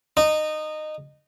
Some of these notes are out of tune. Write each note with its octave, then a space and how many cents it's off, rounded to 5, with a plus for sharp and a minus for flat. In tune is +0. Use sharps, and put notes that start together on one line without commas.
D#4 -20